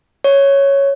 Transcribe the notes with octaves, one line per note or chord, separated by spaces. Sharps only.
C#5